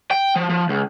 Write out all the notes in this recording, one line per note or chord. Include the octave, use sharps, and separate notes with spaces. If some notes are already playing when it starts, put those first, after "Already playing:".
G5
F3
F3
C#2